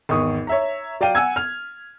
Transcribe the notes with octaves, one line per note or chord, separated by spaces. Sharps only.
G#1 E2 C#6 D#6
C#5 E5 A#5
F#3 D5 F5 G5 D#7
F#5 G#5 E6 G#6
F6 F7